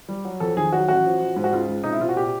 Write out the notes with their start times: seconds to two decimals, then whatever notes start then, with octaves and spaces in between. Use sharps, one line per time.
0.08 G3
0.25 F#3
0.40 F2 A4
0.57 D#3 G#4
0.72 F#3 F#4
0.88 A1 F#4
1.05 F3
1.20 F3
1.36 G#2
1.44 F#4
1.52 C#2 F4
1.69 C#2
1.84 C3 D#4
1.92 E4
2.00 C3 F4
2.09 F#4
2.16 A#2 G4